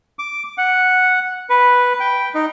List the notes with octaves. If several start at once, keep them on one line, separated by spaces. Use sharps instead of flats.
D6
F#5
B4
G5
D#4